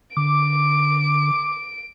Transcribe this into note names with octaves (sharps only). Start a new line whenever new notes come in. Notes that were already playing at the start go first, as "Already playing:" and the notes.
D3 D6 D7